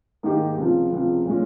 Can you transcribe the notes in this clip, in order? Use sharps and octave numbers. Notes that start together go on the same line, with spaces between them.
G#2 D#3 A#3 D#4 G4
C#2 C3 F3
C#2 C3 F3
A#2 G#3 C#4